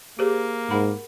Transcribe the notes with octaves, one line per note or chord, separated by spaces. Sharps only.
A#3 G4 G#4 C5
G#2 A#4 F#5 B5